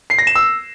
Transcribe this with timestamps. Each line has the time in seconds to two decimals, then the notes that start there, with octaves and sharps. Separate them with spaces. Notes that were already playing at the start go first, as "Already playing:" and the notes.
0.10 C7
0.18 A#6
0.27 E7
0.35 E6